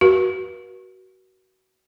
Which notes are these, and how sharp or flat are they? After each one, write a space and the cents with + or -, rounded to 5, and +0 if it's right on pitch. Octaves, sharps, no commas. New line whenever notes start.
F#4 +25 B4 -45